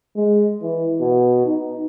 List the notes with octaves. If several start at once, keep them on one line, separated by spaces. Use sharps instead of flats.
G#3
E3
B2
D#4